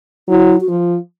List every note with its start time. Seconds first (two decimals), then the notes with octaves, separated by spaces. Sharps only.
0.29 F#3 E4
0.61 F#4
0.69 F3 F4